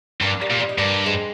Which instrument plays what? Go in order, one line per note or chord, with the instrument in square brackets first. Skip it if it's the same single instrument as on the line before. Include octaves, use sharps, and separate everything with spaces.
[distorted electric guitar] G2 [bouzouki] A#3 D4
[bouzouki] G3 A#3
[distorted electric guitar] A#2
[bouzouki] G3
D#4
[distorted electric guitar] G2 [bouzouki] A#3 D4
[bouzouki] G#3 C4